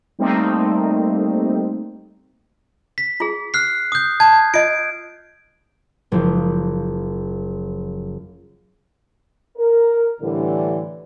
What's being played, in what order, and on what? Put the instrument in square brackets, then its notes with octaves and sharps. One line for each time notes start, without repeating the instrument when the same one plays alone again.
[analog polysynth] G3 A3 A#3 C4 D#4
[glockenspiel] B6
[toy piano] F4 G#4
[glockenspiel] F6 F#6 C7
D#6 G6
[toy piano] A5 [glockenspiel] G#6
[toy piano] F4 D#5 [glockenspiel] D7
[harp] F#1 F3
[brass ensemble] A#4
A2 D3 E3 G3